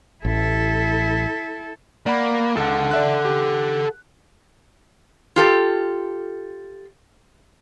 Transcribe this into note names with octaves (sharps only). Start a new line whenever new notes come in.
A1 E4 A4
A#3 D5 F#5 B5
C#2 A4 F#5
D5 E5 F#6
G4
F4 G4 A4